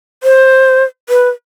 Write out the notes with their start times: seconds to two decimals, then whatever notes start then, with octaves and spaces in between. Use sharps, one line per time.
0.23 C5
1.09 B4